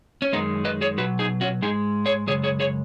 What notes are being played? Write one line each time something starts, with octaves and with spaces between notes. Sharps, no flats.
C#4
F#2 D#3 G#3 B3 D#4
B4 D#5
G#4 C#5
B2 F#3 F#4 B4
D#4 G#4
C#4 F#4
G#2 G#3 D#4 G#4
G#4 C#5
F#2 C#3 G#3 G#4 C#5
G#4 C#5
G#4 C#5